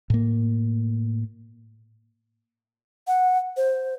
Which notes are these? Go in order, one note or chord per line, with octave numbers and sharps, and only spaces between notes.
A2 A#3
F#5
C5